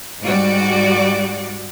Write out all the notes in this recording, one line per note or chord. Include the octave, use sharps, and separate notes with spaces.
G#2 G3 F#4 D5